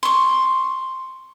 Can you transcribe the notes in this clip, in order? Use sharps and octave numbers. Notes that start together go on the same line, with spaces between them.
C6 C#6